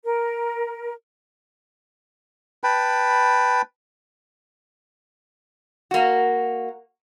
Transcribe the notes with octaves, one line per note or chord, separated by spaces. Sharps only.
A#4
B4 G5 A5 B5
A#3 F#4